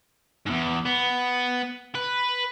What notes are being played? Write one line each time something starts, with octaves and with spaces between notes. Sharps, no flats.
E2 G#2
B3
B4